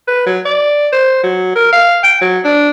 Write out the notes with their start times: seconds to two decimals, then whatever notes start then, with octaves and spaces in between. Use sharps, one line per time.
0.08 B4
0.26 F#3
0.45 D5
0.93 C5
1.23 F#3
1.56 A#4
1.73 F5
2.04 G5
2.21 F#3
2.45 D4